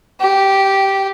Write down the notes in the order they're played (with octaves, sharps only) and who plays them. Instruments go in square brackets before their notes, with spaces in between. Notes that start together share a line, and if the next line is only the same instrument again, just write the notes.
[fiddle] G4